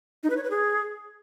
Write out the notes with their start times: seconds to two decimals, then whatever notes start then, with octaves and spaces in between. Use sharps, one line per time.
0.23 D#4
0.30 B4
0.37 C#5
0.44 B4
0.50 G#4